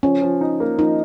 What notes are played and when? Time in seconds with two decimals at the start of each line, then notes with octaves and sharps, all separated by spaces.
0.03 F3 C#4
0.22 F3
0.41 D#4
0.60 A#3
0.79 F3 D#4